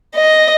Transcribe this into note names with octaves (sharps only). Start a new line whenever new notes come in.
D#5